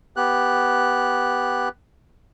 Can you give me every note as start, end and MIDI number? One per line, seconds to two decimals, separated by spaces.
0.17 1.69 59
0.17 1.69 67
0.17 1.69 90